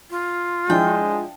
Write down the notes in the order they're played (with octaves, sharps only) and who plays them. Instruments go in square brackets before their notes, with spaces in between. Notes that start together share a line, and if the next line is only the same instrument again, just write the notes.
[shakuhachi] F4
[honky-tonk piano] F3 D4 E4 [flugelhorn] G#3 [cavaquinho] G5